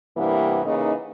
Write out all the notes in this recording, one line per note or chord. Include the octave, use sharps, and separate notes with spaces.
G2 C3 E3 G3 A#3 B3
C#3 E3 A#3 D#4